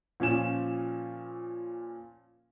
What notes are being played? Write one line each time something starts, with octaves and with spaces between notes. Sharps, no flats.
A#2 F3 C#4 F4 E7